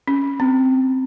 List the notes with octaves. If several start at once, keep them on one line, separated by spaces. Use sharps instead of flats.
C#4
C4